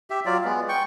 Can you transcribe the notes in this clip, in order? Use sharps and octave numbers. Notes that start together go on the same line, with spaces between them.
G4 E5
F#3 F4 D5
G#3 B3
G5 C#6